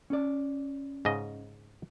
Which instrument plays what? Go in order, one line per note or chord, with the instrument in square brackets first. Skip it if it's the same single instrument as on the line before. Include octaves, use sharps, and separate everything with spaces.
[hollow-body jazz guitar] C#4 D5
[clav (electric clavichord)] G#2 C#3 D#5